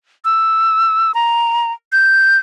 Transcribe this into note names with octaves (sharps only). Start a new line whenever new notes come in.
E6
A#5
G6